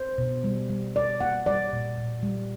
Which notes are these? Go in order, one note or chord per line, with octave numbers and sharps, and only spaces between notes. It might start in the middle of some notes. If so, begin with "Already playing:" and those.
Already playing: C5
B2
G3
G3
G3 D5
A#3 F#5
G3 D5
A#2
A#2
G3